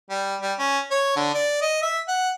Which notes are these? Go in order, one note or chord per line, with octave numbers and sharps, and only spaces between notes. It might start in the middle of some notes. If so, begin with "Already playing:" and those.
G3
G3
C#4
C#5
D3
D5
D#5
E5
F#5